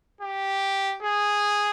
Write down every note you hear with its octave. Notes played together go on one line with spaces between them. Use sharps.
G4
G#4